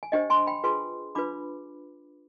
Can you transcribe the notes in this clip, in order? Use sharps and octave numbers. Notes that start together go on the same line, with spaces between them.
G#5
D4 G4 C5 D#5 G5
G#5 C6
G5 B5
F4 G#4 B4 G#5 C6
D4 F4 B4 B5 D6